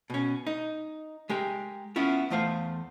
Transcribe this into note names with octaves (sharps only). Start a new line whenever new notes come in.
B2 C#4
D#4
G#3 G4 A#4
B3 C#4 E4 F4
E2 A3 C5 F5